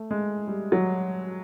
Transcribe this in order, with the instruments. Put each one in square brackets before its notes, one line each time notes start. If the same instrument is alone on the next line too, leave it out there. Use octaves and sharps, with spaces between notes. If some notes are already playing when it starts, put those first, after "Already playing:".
Already playing: [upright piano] A3
G#3
G3
F#3